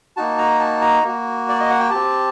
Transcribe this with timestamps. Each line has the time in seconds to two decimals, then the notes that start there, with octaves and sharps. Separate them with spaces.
0.17 A#3 D#4 F#4 A5
0.38 A#5
0.60 A5
0.81 A#5
1.03 A#3 F#4
1.49 D5
1.60 D#5
1.70 F#5
1.79 G5
1.89 C4 G4 A5